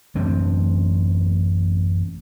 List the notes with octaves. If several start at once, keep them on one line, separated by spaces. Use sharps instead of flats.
A1 F#2 C4 D4